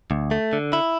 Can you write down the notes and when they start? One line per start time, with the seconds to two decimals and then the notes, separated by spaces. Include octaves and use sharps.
0.11 D2
0.31 A3
0.53 D3
0.73 E4